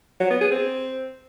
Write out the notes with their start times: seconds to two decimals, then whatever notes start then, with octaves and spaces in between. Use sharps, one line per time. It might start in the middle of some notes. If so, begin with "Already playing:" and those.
0.20 F#3
0.30 B3
0.41 G#4
0.51 C4